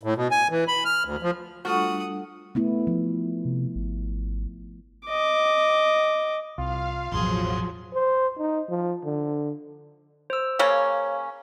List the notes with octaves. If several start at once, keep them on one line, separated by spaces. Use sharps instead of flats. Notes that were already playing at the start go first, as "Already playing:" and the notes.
A2
B2
G#5
E3
B5
F6
D2
F3
G3 A3 D4 F4 F#4 A4 F#5 D#6
A3 B3 E4
F3
C3
G#1
D#5 D6
C2 F4 F5
A1 E2 B2 F3 F#3 G#4 C6
C5
D#4
F3
D3
C5 E6
C#3 A#3 C#4 C#5